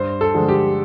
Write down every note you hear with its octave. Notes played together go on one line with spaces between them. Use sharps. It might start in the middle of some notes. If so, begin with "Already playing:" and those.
Already playing: G2 C5
A4
D3 F3 G#3
G4